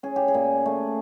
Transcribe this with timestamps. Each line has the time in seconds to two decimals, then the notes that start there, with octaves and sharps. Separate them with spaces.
0.03 C#4 G#4
0.16 G4
0.28 G#4
0.34 A#2
0.66 A3